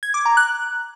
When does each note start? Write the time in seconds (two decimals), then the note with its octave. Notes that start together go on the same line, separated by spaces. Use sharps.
0.03 G#6
0.14 D6
0.26 A#5
0.37 F#6